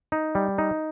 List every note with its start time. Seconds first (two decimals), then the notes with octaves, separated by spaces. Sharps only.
0.12 D#4
0.35 G3
0.58 D#4